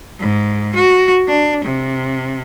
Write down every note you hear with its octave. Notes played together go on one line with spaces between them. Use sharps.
G#2
F#4
D4
C3